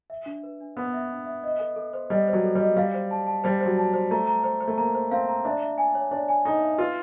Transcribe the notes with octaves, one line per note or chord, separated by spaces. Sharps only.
E5
D4
B4
D4
B3 B4
E5
D4
E5
D#5
A4
A4
C5
G3 D#5
C5
F#3
A4
G3 D#5
G3 F5
C5
A5
A5
G3 C5
C5
F#3
A5
C5
A3 A#5
A#5
C5
C5
A3
A#3 A#5
C5
C4 F5
A#5
D4 E5
E5
G#5
C#5
D4 C#5
G#5
D#4 A4
E5
F4 B4